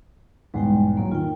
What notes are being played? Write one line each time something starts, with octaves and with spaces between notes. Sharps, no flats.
B1 E2 G#2 G3 G#3 G5
A2 F#3 A#3
D#3 F4 G5